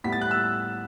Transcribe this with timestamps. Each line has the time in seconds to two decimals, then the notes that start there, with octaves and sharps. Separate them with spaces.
0.04 A2 G3 B3 B6
0.13 A6
0.21 F#6
0.31 E6